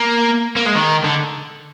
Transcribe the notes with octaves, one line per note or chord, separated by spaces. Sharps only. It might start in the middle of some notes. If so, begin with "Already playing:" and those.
Already playing: A#3
A#3
G#3
D#3
D3